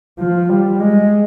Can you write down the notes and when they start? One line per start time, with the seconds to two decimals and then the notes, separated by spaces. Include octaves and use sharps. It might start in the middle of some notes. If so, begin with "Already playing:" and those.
0.19 F3
0.49 G3
0.80 G#3